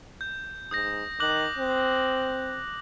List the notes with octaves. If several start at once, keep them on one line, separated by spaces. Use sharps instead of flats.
G6
G#2 D#6 G6 A#6
D#3 D6 F#6 F#7
C4